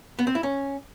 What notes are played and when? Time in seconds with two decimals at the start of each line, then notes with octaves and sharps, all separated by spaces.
0.19 B3
0.27 C4
0.35 E4
0.43 C#4